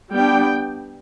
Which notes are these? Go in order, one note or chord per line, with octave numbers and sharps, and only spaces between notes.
G3 B3 D4 G5